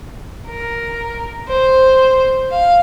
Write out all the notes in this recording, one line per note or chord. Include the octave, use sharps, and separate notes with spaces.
A#4
C5
F5